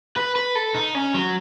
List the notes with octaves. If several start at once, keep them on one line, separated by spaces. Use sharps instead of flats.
B4
B4
A4
D#4
C#4
F#3